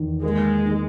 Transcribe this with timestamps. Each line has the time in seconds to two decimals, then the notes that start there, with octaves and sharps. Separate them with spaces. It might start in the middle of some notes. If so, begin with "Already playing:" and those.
Already playing: E2 D#3
0.23 G#3 A#3
0.65 D#3